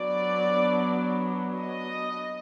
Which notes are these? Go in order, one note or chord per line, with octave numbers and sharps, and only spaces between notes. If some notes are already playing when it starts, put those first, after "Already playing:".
Already playing: F#3 B3 D4 D5
D#5